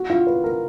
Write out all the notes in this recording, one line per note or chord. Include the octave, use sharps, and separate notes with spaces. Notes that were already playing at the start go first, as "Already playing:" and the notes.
Already playing: F#4
F4
B4
A#4